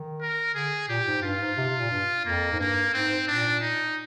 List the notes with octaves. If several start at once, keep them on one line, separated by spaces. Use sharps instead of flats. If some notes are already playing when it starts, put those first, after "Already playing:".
Already playing: D#3
A#4
D3 G#4
A#2 G4
G#2
G2 F4
G#2
C3
C3
A#2
G2
F2 A#3
G#2
G2 A#3
G#2 C4
A#2 D4
D#4